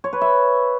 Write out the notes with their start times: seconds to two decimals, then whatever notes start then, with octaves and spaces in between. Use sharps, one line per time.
0.04 C#5
0.13 B4
0.21 E5